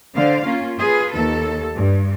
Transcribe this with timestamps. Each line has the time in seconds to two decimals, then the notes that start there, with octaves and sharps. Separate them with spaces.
0.15 D3 C5 D5 F5
0.45 A#3 C#4 F4
0.77 F4 G#4 B4
1.13 D#2 A4
1.77 G2